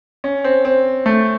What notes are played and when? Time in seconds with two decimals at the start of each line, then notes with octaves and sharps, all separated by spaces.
0.24 C#4
0.44 C4
0.65 C4
1.06 A3